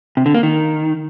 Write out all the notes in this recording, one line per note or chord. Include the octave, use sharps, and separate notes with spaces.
C3
D3
A#3
D#3